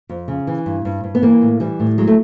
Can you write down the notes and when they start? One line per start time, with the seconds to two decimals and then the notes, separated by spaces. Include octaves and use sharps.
0.09 F2
0.28 C#3
0.47 E3
0.66 G2
0.85 G2
1.04 G2
1.15 B3
1.22 E3 A#3
1.42 A2
1.60 E3 G3
1.80 A2
1.98 F#3 G#3
2.07 A3